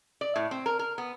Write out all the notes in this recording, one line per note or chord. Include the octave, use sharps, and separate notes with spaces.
D5
A2
C4
A#4
A#4
B3